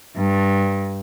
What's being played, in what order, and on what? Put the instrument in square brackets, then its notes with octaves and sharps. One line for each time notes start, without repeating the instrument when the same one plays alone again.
[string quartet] G2